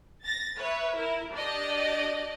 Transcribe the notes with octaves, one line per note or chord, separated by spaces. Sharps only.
A6 A#6
B4 C#5 E5
E4 A#4
D4 G4 D5 D#5